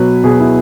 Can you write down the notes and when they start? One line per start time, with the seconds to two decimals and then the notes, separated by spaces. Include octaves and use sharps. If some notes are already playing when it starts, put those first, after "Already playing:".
Already playing: B2 F#3 B4
0.24 B2 F#3 G#4
0.40 E4